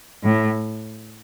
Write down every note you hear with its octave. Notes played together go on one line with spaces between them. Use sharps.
A2